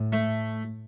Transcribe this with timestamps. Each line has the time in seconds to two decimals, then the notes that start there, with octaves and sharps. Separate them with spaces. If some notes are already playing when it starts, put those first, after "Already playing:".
Already playing: A2
0.12 A3